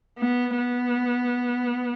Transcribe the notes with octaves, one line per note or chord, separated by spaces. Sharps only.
B3
B3